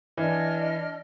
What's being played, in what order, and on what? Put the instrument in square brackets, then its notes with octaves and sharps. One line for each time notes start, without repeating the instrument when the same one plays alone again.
[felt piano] E3 [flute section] D4 D#5 F6